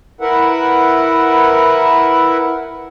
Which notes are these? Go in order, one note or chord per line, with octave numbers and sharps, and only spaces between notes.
E4 A#4 B4 E5 F#5